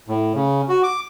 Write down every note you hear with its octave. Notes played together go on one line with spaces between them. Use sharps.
A2
C#3
F#4
D6